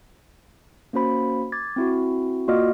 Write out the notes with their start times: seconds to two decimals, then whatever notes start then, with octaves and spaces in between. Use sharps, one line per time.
0.93 A#3 C#4 F#4 C5 B5
1.52 D6 G#6 A6
1.76 C4 E4 F#4
2.48 A#3 F4 F#4 D5 D#5 F6